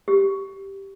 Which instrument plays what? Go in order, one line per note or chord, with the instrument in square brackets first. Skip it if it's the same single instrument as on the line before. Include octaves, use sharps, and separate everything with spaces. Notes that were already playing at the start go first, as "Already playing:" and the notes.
[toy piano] G4